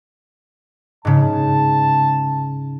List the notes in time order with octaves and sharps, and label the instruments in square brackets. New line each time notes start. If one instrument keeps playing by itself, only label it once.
[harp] G#2 C#3 [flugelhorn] A5